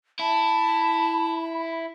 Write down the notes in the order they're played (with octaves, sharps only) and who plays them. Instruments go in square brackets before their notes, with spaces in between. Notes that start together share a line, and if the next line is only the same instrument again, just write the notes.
[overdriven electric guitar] E4 [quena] A5 [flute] B5